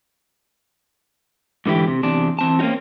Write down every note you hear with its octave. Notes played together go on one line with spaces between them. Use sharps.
G#2 D3 E3 E4 G4
C3
E2 C3 D4
E3 C4 A5
A#3 C4 C#4 D#4 F#4